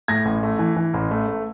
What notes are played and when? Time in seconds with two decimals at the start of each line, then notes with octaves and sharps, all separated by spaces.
0.08 A2 G#6 A#6
0.25 A1
0.43 A3
0.59 E3
0.77 E3
0.94 A1
1.11 A3
1.28 A3